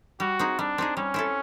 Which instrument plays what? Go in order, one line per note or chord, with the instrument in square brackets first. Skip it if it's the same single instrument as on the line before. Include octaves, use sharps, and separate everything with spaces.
[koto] G3 [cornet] F#4
[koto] C4 D#4 G#4
[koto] G3 [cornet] D4
[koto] C4 D#4 G#4
[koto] G3 [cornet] C#4
[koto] C4 E4 A4